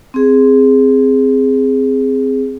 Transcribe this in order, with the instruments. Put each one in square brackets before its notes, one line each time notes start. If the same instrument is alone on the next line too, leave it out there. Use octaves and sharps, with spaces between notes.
[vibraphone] C4 G#4